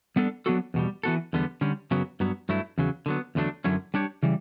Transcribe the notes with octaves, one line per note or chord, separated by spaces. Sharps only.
G3 B3 D4 A4
F#3 B3 D4 F#4 A4
E2 B2 G3
E3 B3 F#4 A4
E2 D3 G3 B3
D3 G3 C#4
F#2 C#3 F#3 B3
G2 F#3 B3
G2 F#3 A3 E4
E2 C#3 F#3
D3 F#3 B3
E2 D3 F#3 A3 D4
F#2 D3 F#3 C#4 E4
G3 D4 G4 C#5
C#3 E3 G3